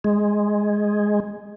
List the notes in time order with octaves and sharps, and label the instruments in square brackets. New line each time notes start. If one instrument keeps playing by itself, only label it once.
[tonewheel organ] G#3